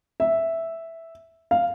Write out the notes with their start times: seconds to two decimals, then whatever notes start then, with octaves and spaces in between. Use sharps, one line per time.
0.20 E5
1.51 F5